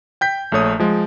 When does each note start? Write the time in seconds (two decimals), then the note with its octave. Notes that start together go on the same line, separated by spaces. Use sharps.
0.21 G5 G6 B6
0.52 A#1 A3 C#5 D#6
0.79 F3 G#3